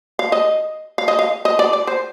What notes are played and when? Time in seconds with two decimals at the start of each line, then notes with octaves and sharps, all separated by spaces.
0.19 F5
0.32 D#5
0.98 F5
1.08 D#5
1.19 F5
1.45 D#5
1.59 D5
1.73 D5
1.87 C5